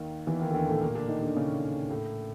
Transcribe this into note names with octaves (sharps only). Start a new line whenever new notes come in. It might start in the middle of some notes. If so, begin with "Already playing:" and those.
Already playing: D#2 D#3
E2 E3
D#2 D#3
D3
D#2 D#3
A2 A3
A#2 A#3
D3 D4
D#3 D#4
D3 D4
C#3 C#4
A2 A3